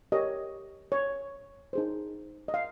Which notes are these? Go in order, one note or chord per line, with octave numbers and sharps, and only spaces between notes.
G4 A#4 C#5 D#5
C#5
D#4 G#4 C5
D#5
F5